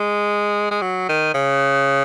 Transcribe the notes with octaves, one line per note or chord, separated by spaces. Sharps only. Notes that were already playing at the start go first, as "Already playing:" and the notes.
Already playing: G#3
G#3
F#3
D#3
C#3